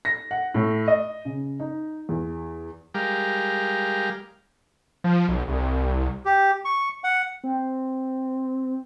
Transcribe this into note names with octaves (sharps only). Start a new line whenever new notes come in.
A#6
F#5
A2
D#5
C#3
D#4
E2
G3 G#3 G4 A#4 F5
F3
B1
C2
G4
C#6
F#5
C4